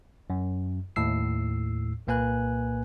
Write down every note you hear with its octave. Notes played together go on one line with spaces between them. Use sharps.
F#2
D#2 A2 E6 C7
C2 A#2 A#3 B4 G#5 F#6